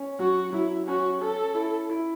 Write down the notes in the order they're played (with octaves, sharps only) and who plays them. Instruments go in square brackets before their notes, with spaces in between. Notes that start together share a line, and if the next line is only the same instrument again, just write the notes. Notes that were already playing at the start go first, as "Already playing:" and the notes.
Already playing: [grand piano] C#4
[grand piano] F#3 [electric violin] F#4
[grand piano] F#3 [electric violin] E4
[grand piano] C#4 [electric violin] F#4
[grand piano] C#4 [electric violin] A4
[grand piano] E4
E4